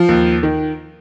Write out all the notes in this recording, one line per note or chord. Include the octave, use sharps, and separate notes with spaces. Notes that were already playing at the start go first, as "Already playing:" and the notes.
Already playing: F3
D#2
D#3